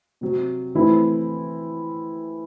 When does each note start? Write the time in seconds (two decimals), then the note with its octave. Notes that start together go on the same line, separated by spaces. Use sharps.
0.21 C3 F#3 C4
0.75 E3 A3 C4 E4